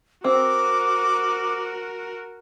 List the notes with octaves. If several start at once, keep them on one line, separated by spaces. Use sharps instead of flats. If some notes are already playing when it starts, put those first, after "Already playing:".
C4 F#4 A#4 D6